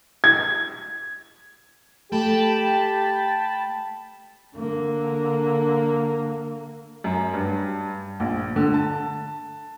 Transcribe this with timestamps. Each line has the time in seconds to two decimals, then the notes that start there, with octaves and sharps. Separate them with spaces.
0.24 G#6
2.12 A3 G4 G5 A5 B5
4.56 D3 A#3
7.04 F#2
7.33 G2
8.20 A#1
8.56 D3
8.74 A5